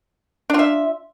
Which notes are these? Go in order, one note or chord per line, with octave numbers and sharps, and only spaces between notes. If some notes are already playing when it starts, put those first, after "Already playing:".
D4 F4 E5